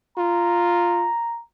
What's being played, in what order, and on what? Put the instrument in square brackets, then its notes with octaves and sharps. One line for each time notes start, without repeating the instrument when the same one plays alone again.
[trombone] F4 [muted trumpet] A#5